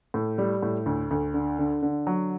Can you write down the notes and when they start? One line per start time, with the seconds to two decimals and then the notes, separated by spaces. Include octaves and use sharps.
0.14 A2
0.38 G3
0.63 A2
0.86 D2
1.11 D2
1.34 D3
1.59 D3
1.83 D3
2.07 F#3